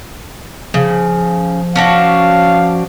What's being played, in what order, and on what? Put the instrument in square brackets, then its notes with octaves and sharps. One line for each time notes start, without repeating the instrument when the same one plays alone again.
[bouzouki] C#3 [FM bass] F3
[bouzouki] C#4 D4 F#4 [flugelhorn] F5